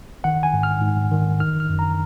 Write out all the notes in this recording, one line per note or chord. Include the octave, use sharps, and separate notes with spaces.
D#3 F#5
G#5
G#2
F6
G#2
D#3
D#3 F6
F6
F#2
A#5